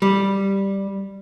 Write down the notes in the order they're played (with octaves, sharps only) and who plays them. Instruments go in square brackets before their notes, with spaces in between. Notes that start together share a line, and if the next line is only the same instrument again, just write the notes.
[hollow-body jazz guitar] G3